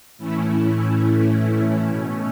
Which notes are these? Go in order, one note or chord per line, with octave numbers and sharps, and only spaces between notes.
A2 E3 A3 C#4 E4
B2 A3 C#4